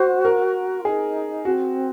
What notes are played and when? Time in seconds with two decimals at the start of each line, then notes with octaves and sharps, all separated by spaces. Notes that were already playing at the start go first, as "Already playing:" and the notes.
Already playing: F#4 C5
0.25 A#4
0.80 F4
0.85 D#4 G#4
1.45 C4 F#4